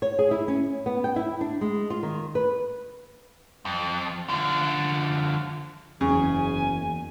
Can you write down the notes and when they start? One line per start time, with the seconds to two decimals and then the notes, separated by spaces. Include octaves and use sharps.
0.02 C#5
0.19 G#4
0.31 E4
0.48 C#4
0.86 B3
1.04 G5
1.16 E4
1.41 D4
1.61 G#3
1.90 F4
2.03 D#3
2.35 B4
3.65 F2
4.29 D3 F3
6.01 F#1 E2 C#3 G#5